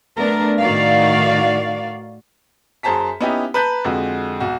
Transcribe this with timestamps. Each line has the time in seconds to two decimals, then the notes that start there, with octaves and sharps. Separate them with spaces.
0.15 A3 B3 D4 A#4
0.59 A2 D#3 F#4 D5 F5
2.83 F#2 G#4 C5 A5 A#5 B6
3.21 B3 C#4 D#4 E4 G4
3.54 B4 A5 A#5 F#6 G6 B6
3.85 F2 D3 G#3 F#4
4.40 B1 F#4